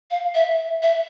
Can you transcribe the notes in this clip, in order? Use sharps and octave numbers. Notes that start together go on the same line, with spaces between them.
F5
E5
E5